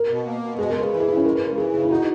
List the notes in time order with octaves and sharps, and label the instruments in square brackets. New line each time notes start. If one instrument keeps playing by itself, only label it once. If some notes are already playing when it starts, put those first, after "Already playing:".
Already playing: [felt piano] A#4
[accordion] B2
A#3
B2
[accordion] G#3 [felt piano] G#4
[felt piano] A#4
[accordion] C#3
[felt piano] B4
[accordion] E3
[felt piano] G#4
[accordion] C#3 [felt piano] E4
[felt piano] C#4
[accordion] G#3 [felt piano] A#4
[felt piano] B4
[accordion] C#3
[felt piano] A#4
[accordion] E3 [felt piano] G#4
[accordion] C#3 [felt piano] G#4
[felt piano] E4
[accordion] D#4 [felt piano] F#4